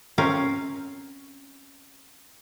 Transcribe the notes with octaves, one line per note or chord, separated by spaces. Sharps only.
C4 C#4 A#4 F5